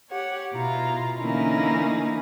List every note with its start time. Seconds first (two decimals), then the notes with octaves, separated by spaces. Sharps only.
0.10 G4 C#5 F#5
0.53 B2 E4 F4 A#5
1.19 D3 E3 A#3 C#4 D#4 E4